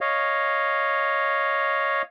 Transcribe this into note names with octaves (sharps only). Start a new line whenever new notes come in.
C#5 D#5 F5